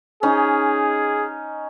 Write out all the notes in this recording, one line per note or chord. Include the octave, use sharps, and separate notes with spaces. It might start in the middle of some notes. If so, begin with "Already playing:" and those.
C#4 D#4 G#4